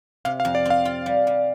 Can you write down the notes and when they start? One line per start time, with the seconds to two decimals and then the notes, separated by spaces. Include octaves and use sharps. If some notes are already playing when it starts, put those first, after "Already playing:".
0.25 C3 F5
0.40 F5
0.45 F2
0.55 D5
0.65 C4 F5
0.85 F4
1.06 G3
1.27 G3